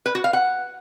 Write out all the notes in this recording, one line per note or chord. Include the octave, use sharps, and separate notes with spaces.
B4
F#4
F5
F#5